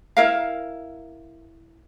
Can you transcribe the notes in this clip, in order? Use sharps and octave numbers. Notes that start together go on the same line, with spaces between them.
E4 A#4 F5